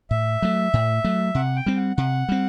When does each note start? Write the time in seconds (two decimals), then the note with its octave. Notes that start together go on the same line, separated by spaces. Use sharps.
0.11 A2 E5
0.42 F#3 A3
0.73 A2
1.04 F#3 A3
1.35 C3 F#5
1.56 G5
1.66 G3 C4
1.76 F#5
1.97 C3 F#5
2.29 G3 C4